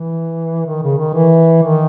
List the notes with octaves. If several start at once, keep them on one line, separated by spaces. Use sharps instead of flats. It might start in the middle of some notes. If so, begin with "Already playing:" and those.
Already playing: E3
D#3
C#3
D#3
E3
D#3